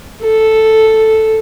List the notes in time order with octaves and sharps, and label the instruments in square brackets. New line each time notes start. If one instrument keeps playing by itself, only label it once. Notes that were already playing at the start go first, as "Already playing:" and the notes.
[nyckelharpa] A4